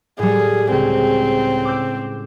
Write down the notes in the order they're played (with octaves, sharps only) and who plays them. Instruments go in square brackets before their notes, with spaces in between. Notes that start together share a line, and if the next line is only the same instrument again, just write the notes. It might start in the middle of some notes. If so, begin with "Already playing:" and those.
[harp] A2 G3 [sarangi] G#4
[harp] C#2 [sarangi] C4
[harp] D6 E6 G6